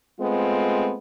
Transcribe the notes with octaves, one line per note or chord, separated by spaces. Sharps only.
G#3 A3 B3 C4 F4